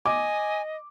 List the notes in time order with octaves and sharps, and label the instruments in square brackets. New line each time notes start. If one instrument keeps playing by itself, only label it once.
[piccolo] D#5 [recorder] G#5 [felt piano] D6